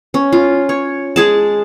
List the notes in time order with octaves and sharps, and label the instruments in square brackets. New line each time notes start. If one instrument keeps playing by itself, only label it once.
[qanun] C#4
F4
C#5
G#3 G#4 A5